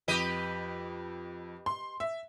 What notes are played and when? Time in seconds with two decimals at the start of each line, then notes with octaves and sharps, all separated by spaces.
0.08 F2 G4 B4 D#5
1.66 C6
2.00 E5